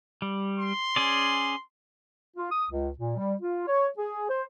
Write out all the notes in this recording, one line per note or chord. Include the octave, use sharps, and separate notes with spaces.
G3
C6
C#4 G#4 D5
F4
D#6
C#2
A#2
G3
F4
C#5
G#4
C5